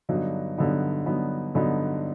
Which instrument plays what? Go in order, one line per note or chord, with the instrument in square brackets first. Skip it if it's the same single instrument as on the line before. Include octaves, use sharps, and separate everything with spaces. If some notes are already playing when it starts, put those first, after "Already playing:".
[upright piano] G2 D3 F#3 B3 D#4
G2 D3 F#3 B3 D#4
G2 D3 F#3 B3 D#4
G2 D3 F#3 B3 D#4